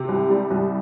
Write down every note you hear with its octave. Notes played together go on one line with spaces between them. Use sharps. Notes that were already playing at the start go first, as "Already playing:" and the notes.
Already playing: C3
C2
G3
C2